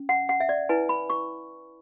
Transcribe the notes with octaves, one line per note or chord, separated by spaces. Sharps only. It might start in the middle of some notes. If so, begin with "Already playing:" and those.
Already playing: C#4
F#5
F#5
E5
D5
E4 B4 G#5
B5
C#6